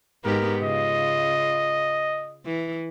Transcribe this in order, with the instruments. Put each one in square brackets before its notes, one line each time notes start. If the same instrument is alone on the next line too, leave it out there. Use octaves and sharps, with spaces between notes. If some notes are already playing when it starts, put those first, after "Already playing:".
[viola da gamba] G#2 B3 G4 [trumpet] A#4
[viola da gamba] C#3 F4 [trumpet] D#5
[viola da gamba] E3